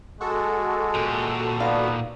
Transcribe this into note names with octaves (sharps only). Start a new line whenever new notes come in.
G#3 F#4 A4
A#2 G4
B3 D#4 D5 F5